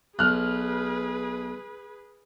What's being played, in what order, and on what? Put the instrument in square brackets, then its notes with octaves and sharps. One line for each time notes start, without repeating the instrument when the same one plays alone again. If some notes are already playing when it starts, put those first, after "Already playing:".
[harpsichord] B1 [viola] G#4 B4 [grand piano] F6 F#6